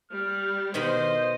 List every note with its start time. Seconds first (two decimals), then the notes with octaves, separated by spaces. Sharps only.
0.11 G3 F6
0.74 B2 D#3 C5 D#5 B5